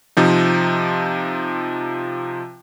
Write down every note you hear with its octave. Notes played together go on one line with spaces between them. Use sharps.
C3 F3 D#4